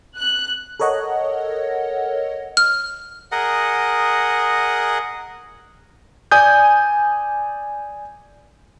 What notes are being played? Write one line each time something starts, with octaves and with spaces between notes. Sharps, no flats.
F#6
A4 A#4 C#5 D#5 F#5
F6
G#4 A#4 D#5 F#5
D5 G#5 D#6 G6